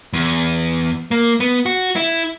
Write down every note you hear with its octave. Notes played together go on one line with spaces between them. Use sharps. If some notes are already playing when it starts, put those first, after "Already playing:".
E2
A#3
B3
F#4
E4